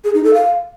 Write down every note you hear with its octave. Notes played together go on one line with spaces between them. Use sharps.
G#4
D#4
A4
F5